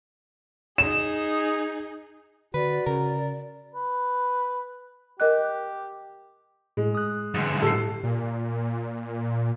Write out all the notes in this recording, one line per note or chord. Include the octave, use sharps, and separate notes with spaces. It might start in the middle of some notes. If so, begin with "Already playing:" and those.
D#4 G#4 E7
D3 F#4 B4 D5
C#3 A#4
B4
G4 A#4 D#5 F#6
A2 G#3
D#6 F#6
G#2 D3
A2 G4 A4 C7
A#2